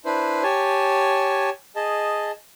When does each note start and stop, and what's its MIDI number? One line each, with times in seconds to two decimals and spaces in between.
0.05 0.43 62
0.05 0.43 64
0.05 0.43 71
0.05 0.43 72
0.43 1.50 67
0.43 1.50 73
0.43 1.50 80
0.43 1.50 81
1.76 2.31 68
1.76 2.31 75
1.76 2.31 81